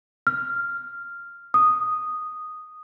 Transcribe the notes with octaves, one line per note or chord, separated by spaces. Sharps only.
F6
D#6